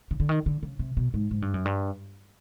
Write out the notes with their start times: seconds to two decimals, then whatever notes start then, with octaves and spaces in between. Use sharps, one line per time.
0.11 C#3
0.20 D3
0.29 D#3
0.46 D3
0.63 C#3
0.79 C3
0.97 B2
1.14 G#2
1.31 G#2
1.42 G2
1.54 F#2
1.65 G2